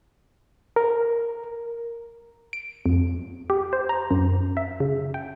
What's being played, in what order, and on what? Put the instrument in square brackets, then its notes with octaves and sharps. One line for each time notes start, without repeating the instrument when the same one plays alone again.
[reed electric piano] A#4
[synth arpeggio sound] D7
F2
G4
C5
A#5
F#2
E5
C#3
G5